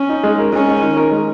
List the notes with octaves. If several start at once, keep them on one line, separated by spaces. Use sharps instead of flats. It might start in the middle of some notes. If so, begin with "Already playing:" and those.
Already playing: C#4
D#4
G#3
A#4
G#3 C#4
D#4
D#3
A#4
G#3